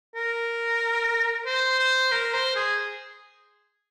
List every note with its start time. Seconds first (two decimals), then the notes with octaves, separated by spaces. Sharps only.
0.15 A#4
1.46 C5
1.79 C5
2.11 A#4
2.34 C5
2.56 G#4